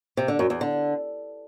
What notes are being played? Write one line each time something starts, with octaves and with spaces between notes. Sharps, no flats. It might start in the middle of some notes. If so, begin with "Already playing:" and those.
C3
D3
F#2
E2
D3